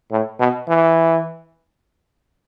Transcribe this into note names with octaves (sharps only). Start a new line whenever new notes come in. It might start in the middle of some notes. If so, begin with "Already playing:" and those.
A2
B2
E3